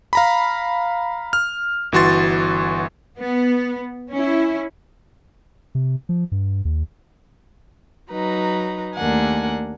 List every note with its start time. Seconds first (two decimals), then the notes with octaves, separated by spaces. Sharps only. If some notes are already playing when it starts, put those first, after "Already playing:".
0.13 F5 A#5 B5
1.33 F6
1.92 G1 E3 F#4 C6 A6
3.18 B3
4.11 C#4 E4
5.75 C3
6.09 F3
6.32 G2
6.65 D#2
8.11 F#3 D#4 B4 A#5
8.96 D#2 A3 D4 A#4 F#5 G#5